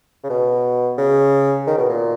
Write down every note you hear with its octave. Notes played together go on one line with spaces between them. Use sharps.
C#3
B2
C#3
D#3
B2
A#2